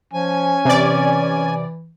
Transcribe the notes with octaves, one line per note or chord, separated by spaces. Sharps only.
F3 C#4 G#5
C3 E3 D5